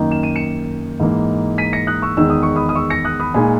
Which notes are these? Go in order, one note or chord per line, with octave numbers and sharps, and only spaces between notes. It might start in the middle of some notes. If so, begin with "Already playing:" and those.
Already playing: F#2 D#3 A#3 D#4
E7
D#7
C#7 E7
G#2 E3 A#3 D#4
B6 D#7
A#6 C#7
D#6 F#6
C#6 E6
E2 D#3 G#3 D#4 E6
D#6
C#6
B5 D#6
D#6
C#6 E6
A#6 C#7
D#6 F#6
B5 D#6
A#2 G#3 D#4 G#5 B5